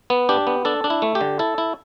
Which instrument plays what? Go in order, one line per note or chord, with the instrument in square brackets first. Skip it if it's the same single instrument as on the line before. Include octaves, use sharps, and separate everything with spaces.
[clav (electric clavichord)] B3
D4 G4
B3
D4 A4
D4
E4
A3
G4
D3
E4 A4
E4